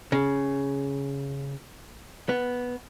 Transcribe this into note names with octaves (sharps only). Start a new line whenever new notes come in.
C#3
B3